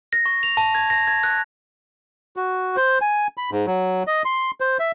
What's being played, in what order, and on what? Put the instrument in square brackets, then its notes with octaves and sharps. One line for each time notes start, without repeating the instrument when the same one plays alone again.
[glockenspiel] A#6
C#6
F7
A5
G#6
A#6
G#6
F#6
[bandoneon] F#4
C5
G#5
B5
G#2
F#3
D#5
C6
C5
E5